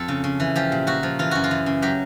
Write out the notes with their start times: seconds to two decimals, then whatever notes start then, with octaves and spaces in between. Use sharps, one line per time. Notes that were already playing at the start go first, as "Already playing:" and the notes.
Already playing: F2 A4
0.08 C#3
0.24 C#3
0.40 E3
0.56 F3 G4
0.72 A#2
0.87 A#2 F#4
1.03 F3
1.19 E3 F4
1.31 F#2 F#4
1.44 F4
1.51 E3
1.66 C#3
1.82 F#3 G4